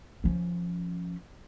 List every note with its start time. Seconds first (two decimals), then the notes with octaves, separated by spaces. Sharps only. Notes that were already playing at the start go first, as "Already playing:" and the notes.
0.24 F3 C#4